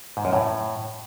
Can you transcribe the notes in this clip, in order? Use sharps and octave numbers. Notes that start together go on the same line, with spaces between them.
G#2
F#2
A2